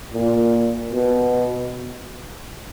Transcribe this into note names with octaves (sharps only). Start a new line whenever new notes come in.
A#2
B2